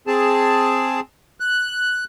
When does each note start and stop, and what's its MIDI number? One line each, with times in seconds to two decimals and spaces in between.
0.07 1.00 60
0.07 1.00 68
0.07 1.00 81
1.40 2.04 90